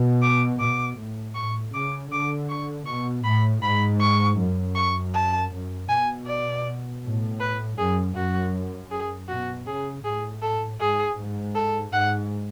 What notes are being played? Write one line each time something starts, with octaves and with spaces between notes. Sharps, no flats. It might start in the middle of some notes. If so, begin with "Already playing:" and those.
Already playing: B2
D6
B2 D6
A2
A2 C#6
C#3 D6
D3 D6
C#6
B2 C#6
A2 B5
G#2 B5
C#6
F#2
C#6
A5
F#2
B2 G#5
D5
A2
B4
F#2 G#4
F#2 F#4
G#4
B2 F#4
C#3 G#4
A2 G#4
A4
G#2 G#4
G#2
A4
G#2 F#5